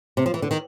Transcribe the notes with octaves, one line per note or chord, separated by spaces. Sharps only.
C3
F3
E3
D3
D#3